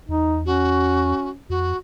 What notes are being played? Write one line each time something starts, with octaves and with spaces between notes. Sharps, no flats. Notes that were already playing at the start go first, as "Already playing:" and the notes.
E2 D#4
C#4 F#4
F2 F#4